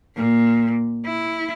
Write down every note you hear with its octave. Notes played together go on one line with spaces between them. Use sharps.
A#2
E4